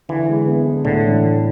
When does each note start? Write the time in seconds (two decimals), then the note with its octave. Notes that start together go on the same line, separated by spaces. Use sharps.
0.09 D3 E3
0.29 G#3
0.48 B3
0.66 D4
0.85 A2 D3
1.04 E3
1.22 A3